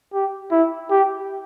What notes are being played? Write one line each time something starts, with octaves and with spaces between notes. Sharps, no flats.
G4
E4
G4